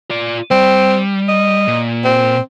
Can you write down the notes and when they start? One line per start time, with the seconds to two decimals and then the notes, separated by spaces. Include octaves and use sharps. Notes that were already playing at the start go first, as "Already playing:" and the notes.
0.11 F4 D5
0.51 G3 C4
1.28 D#5
1.68 A#2
2.04 C4